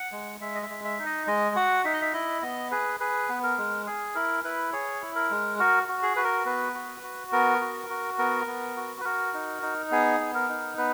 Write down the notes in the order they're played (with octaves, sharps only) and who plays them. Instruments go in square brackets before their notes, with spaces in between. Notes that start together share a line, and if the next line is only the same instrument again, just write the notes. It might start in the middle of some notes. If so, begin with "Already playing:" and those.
Already playing: [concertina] F#5
G#3
G#3 E5
D#5
E5
G#3
E5
D#4
D#5
G#3 D#5
F#4 F#5
D#4 E5
D#5
E5
E4 D#5
B3 D#5
G#4 B4
G#4 B4
B3
A#4
G#3
G#4
E4 A#4
E4 B4
G#4 C#5
E4
A#4
G#3
F#4 A#4
F#4
G#4
F#4 B4
A#4
B3 B4
F#4
F#4
B3 A#4
F#4
F#4
B3 A#4
B3
F#4
B4
F#4 A#4
D#4
D#4
B3 G#4
B3
A#4
D#4
B3 B4